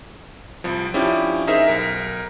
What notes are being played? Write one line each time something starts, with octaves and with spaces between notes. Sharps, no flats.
C2 F3
F3 C#4 D4 E4 G4
D#4 G#4 A#4 C5 E5
B1 A#4 B6